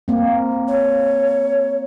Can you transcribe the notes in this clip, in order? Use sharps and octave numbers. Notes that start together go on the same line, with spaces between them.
A#3 C4
C#5